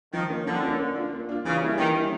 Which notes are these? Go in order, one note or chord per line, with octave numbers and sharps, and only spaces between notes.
D#3 F3
A#3 C#4
D3 F3
A#3 C#4
A#3
D4 F4
A#3
D4 F4
C#3 E3
G3 A#3 C#4 E4
D#3 E3
G3 A#3 C#4 E4